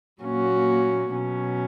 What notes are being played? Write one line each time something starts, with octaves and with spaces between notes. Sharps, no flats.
A#2 F#3 A#3 C#4 F#4
B2 F#3 C#4